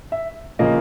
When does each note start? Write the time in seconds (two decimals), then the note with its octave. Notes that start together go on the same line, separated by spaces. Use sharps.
0.12 E5
0.59 C#3 F3 A#3 D#5